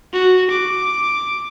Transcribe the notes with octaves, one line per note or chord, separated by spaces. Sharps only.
F#4
D6